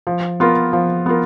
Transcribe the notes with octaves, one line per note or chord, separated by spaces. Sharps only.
F3
B3 F4 A#4
F3
B3 F4 A#4